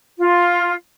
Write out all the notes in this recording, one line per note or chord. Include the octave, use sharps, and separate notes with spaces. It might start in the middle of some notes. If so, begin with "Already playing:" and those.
F4